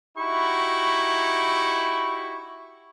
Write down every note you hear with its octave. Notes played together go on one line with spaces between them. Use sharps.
D#4 E4 F#4 G4 B5 C#6